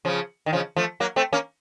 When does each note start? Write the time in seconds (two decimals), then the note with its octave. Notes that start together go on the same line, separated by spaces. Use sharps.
0.05 C#3 F3
0.46 D#3
0.53 C#3 F3
0.76 F3 A3
1.00 F#3 A#3
1.16 A3 C4
1.33 A#3 C#4